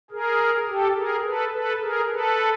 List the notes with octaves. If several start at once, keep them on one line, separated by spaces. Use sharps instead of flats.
G#4 A#4
G4 A4
G#4 A#4
A4 B4
A4 B4
G#4 A#4
A4 B4